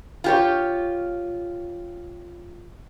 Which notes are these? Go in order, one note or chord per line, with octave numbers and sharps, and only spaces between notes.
F4 G4 C#5